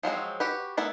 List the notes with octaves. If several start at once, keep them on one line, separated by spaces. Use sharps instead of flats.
F3 F#3 G#3 C4
F#4 G4 B4
A3 B3 E4 A#4